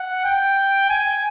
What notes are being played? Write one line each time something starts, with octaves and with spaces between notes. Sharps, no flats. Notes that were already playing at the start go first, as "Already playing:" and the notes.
Already playing: F#5
G5
G#5